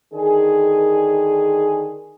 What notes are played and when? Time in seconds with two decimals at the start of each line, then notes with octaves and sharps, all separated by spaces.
0.13 D3 D#3 G#4